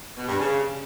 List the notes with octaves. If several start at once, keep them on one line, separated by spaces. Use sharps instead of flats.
B2
G2
C#3